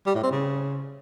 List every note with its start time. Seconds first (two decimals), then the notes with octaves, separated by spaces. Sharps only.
0.06 G3
0.15 A2
0.23 C4
0.31 C#3